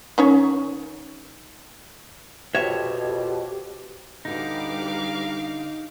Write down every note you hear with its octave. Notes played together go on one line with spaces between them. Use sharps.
D#3 C#4 C#5
F2 B2 G4 C#5 E5
D3 G3 D#4 F#4 B4 F5 D6